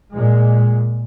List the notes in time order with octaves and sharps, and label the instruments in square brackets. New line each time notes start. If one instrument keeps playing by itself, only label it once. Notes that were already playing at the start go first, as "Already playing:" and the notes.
[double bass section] A#2 G#3